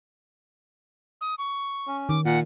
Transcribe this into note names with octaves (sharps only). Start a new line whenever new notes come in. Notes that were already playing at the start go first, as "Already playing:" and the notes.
D#6
C#6
C#4
D#3 D6
A#2 F#5